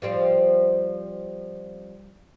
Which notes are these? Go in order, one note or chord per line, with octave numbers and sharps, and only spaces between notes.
F3 G3 C4